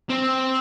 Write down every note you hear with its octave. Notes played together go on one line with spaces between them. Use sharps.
C4